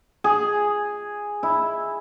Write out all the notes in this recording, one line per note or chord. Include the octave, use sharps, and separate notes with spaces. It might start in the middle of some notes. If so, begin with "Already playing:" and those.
G#4
E4